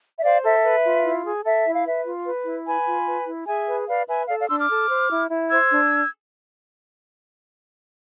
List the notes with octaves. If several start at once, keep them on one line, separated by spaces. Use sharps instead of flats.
E5
C5 D5 F5
A4 E5
B4
F4
E4
G#4
A4 E5
E4
F5
B4 E5
F4
B4
E4
B4 G#5 B5
F4
B4
E4
G#4 E5 G#5
B4
B4 D5 F5
B4 E5 G#5
A4 D5 F5
D5 F5
D4 C6 E6
D6 F6
A4
C5
E4
E4
C5 E6 G#6
D4